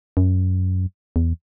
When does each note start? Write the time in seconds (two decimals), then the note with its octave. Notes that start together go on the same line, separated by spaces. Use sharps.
0.17 F#2
1.16 E2